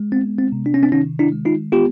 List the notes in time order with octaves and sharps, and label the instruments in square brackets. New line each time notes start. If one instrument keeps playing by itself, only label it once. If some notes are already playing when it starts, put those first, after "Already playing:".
Already playing: [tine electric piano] G#3
B3 C4
C4
C3
D4
C#4
C4 D4
D#3 C#4 D#4
D4 E4
G#3
D#4 F4
B3 F4 G4